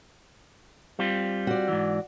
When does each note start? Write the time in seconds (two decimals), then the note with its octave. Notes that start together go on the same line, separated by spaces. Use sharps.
0.99 G3 C4 F4
1.47 F#4 D5
1.68 G#2 E3